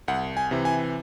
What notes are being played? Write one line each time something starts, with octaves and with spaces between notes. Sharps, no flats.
C2 F#5
G#5
C3 E3
G#5